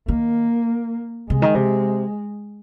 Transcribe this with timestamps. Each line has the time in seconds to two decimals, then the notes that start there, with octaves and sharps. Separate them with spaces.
0.08 D#3 A#3
1.30 C3 G#3
1.42 D#3
1.55 C3